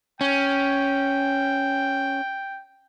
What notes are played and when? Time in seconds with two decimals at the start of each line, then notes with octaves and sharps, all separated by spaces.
0.21 C#4 G5